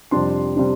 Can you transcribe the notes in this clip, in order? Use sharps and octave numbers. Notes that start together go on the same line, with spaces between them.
F2 C3 G3 D4 C6
C3 G3 D4